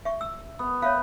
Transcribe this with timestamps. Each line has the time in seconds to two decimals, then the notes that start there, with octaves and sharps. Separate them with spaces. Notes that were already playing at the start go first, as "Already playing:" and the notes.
0.05 E5 C#6
0.21 E6
0.59 B3
0.82 B4 C#5 E5 F5